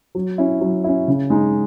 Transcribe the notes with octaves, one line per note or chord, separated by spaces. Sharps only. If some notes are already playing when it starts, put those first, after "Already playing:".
F#3
C#4 E4
F#3
C#4 E4
C#3
G#3 D#4